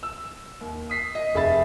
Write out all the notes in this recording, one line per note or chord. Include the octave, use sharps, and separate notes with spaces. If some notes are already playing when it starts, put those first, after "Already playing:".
E6
D#2
D#6 B6 C7
D#5
F1 G#4 E5 B5 A6